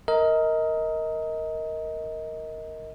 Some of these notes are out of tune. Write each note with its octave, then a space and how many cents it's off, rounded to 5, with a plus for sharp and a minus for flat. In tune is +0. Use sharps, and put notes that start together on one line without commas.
A#4 -5 D#5 +25